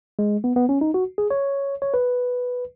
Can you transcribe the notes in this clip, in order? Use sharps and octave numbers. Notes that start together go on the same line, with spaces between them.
G#3
B3
B3
C#4
D#4
F#4
G#4
C#5
C#5
B4